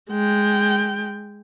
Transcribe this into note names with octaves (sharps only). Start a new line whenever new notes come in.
G#3 G5